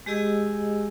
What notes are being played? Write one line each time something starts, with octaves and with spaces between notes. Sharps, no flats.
G#3 G4 G#4 D#5 G#5 E6